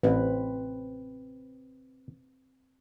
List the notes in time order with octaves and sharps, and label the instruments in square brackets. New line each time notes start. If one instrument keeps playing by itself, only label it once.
[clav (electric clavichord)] A1 [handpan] C4 B4